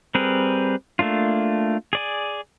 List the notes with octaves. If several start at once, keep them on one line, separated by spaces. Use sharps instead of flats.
G3 C4 G#4 A#4 B4
A3 A#3 D4 F4
G#4 D5 G#5